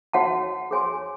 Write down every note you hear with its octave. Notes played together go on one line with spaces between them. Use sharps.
F#4 C#5 F#5 A5
G#4 C#5 G#5 C6